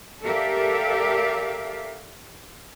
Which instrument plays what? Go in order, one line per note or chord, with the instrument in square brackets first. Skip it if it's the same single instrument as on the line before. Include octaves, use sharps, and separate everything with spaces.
[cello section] G4 A4 A#4 D5 E5 F5